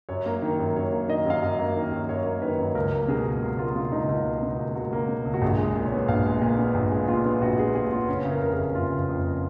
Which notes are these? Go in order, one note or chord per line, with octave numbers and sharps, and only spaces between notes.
F#2 C#5
A#3
D#3
F#2
F#2 C#5
A#3
D#3 D#5
F#2 F5
F#2 D#5
A#3
D#3
F#2
F#2 C#5
A#3
D#3 B4
F#2
C#2 A#4
A#3
B2 G#4
C#2
C#2 F#4
A#3 F4
B2 F4
C#2 D#4
C#2 F4
A#3
B2
C#2
C#2 F#4
A#3
B2
C#2
F#4
A#1 G#4
G#3
G#4
A#2
C#5
B3
A#1 F5
G#3
A#2
B3
A#1
G#3
A#2 F4
B3
A#1 F#4
G#3 G#4
A#2 G#4
B3 F4
F#1 C#4
C#3
A#4
F2 A#4
G#4
F#1
F#1 F4
C#3
F2